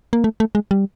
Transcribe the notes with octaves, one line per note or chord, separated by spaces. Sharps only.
A#3
A3
A3
G#3
G3